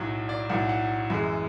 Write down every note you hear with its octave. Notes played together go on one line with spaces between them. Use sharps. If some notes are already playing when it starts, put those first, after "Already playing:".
Already playing: B1 A2 F#3
D5
B1 A2 F#3 F#5
F#5
F#2 E3 G#3